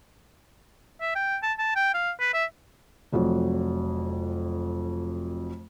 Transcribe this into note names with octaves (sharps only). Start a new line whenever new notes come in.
E5
G5
A5
A5
G5
F5
B4
E5
F1 F2 F#3